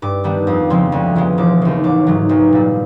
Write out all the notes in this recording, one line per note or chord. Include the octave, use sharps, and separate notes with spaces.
G2 D6
D#3 G3 B3 D4
F2 D#6
C#3 F3 G#3 C4
D2
C#3 F3 G#3 B3
E1 D6
D#2 C#3
A1 D6
G#2 D#3 F#3
B1
A#2 G3